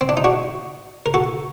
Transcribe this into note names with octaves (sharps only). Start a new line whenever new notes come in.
C4
D4
D#4
D4 F#4
A#4
F#4 A4